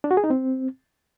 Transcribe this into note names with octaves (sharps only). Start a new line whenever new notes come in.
D4
F#4
G#4
D#4
C4